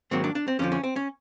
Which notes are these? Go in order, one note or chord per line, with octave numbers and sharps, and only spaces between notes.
G#2 D#3 F#3 A#3 C4
D4
D4
C4
F2 D3 F3 C#4
C#4
C4
C#4